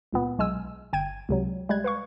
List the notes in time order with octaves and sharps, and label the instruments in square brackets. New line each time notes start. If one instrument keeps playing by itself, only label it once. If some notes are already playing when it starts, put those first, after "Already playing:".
[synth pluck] C#2 A#2 B3
B1 G#3 G#5 E6
G1 G5 G#6 D#7
C#2 C3 F#3
G3 G#3 F#6 G#6
B4 F5 C#6